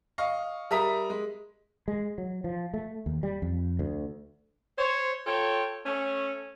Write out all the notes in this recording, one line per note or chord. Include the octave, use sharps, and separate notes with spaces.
D#5 F5 C#6
G3 A#4 E5 A#5 D#6 B6
G#3
G#3
F#3
F3
A3
D#2
G3
F2
D2
C5 C#5
F4 A4 C#5 G5
A3 C#4